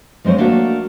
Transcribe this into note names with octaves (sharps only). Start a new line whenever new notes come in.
F3 G#3 C4 C5 C#5
A3 A#3 D4 F#4